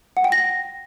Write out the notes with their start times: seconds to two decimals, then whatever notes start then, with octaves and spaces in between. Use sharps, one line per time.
0.17 F#5
0.24 G5
0.32 A#6